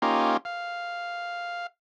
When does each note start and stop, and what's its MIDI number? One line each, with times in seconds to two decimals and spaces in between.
0.02 0.37 58
0.02 0.37 61
0.02 0.37 63
0.02 0.37 65
0.02 0.37 67
0.45 1.67 77